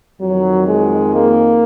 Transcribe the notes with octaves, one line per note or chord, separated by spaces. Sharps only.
F2 D#3 F#3
G#3
A#3